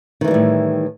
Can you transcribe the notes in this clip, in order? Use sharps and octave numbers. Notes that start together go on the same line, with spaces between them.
A2 D#3 E3 G3 A#3